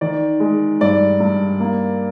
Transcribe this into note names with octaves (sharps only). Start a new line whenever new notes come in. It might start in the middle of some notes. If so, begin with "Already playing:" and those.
D#3 D5
G#3
G2 D5
G2
A#3